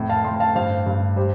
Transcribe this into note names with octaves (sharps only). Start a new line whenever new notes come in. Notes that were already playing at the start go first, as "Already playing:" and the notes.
Already playing: F2 A2
F5 A5
A2 G5 C6
F5 A5
G2 C5 F5
G2
G3 G4 C5